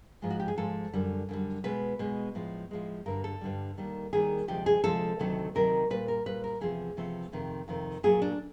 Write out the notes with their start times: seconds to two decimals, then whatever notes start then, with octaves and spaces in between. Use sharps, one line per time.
0.22 G#2 F3 G#3
0.30 F#4
0.40 G4
0.48 G#4
0.57 G#2 F3 G#3 A4
0.93 F#2 D3 G3
1.29 F#2 D3 G3
1.64 B2 G#3 B4
1.99 B2 G#3
2.35 A2 F3 G#3
2.71 A2 F3 G#3
3.06 G2 D3 G3 A#4
3.24 A4
3.41 G2 D3 G3
3.78 D#2 D#3 G3
4.13 D#2 D#3 G3 G#4
4.48 D2 C3 F3 G#3 G4
4.66 G#4
4.83 D2 C3 F3 G#3 A4
5.19 D2 C3 D#3 F#3 A3
5.55 D2 C3 D#3 F#3 A3 A#4
5.90 A#2 G3 B4
6.08 A#4
6.26 A#2 G3 B4
6.44 A#4
6.61 E2 C3 F3 A3 G#4
6.97 E2 C3 F3 A3
7.32 F2 C3 D#3
7.68 F2 C3 D#3
8.03 A#2 F#3 A3 G#4
8.22 D4